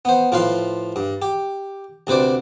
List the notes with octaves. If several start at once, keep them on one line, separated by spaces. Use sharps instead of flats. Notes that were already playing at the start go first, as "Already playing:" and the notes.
B3 C5
A2 F3 F4 B4 F5 C6
G2
G4
D2 C3 B4 C5 D5